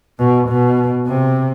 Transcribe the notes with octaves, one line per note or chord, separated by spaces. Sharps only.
B2
B2
C3